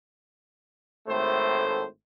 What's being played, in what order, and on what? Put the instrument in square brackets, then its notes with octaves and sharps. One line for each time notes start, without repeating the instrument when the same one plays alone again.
[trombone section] G#1 A2 A3 C5